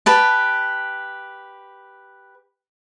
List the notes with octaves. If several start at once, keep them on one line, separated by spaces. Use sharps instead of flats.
G4 B4 A5